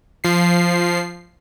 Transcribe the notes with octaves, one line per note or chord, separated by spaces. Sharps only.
F3 C7